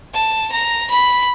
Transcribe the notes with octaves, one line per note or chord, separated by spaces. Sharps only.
A5
A#5
B5